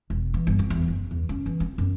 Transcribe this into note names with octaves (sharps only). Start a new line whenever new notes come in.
E1
E3
G1
C4
E2
F#1
E2
C#4
E3
C4
F#2